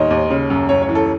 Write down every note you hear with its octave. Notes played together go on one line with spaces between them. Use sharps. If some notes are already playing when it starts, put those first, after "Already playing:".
Already playing: D#2 D#3 C5 C#5 D#5
D#2
C#3
F#2
F#2 C#5
C#5
E3
A4